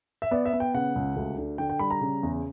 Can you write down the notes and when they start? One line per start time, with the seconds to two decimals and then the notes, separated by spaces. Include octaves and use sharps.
0.22 E5
0.31 B3 D5
0.45 E5
0.53 B3
0.60 G5
0.74 C#3 F#5
0.95 C#2
1.16 D2
1.38 D3
1.58 D3 G5
1.70 G5
1.79 G3 B5
1.90 A#5
2.01 C#3
2.23 E2